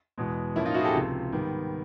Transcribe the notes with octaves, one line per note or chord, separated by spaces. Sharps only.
E2 B2 G#3
A2 F3 A#3 C#4 E4
D#4 F4
E4 F#4
G#4
G4 A4
C#2 C3 F3
G#2 D#3 G3 B3